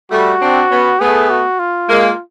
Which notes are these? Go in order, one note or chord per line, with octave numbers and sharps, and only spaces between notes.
G3 A3 F#4
C4 D4
B3 C#4
A3 B3 G#4
F#4
F4
G#3 A#3